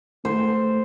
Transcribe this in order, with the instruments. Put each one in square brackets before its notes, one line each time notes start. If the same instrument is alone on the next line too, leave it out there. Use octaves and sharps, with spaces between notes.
[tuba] A3 [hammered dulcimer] C5